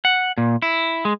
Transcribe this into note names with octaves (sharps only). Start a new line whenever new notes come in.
F#5
A#2
E4
G#3